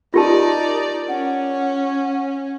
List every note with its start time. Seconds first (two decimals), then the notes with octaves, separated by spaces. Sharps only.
0.14 D#4 F4 G4 A#4 D5 A5
1.09 C#4 F#5